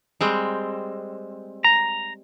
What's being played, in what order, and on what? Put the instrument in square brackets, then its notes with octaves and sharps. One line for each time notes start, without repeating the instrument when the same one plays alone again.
[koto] G3 G#3 C4
[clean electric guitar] A#5